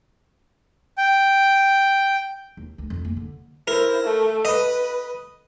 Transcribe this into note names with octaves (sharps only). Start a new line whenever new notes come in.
G5
D#2
D2
F2
A#3
D3
E4 A#4 C5
A3
B4 D#5